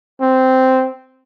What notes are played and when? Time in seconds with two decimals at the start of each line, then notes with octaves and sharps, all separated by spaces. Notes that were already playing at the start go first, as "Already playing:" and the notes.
0.21 C4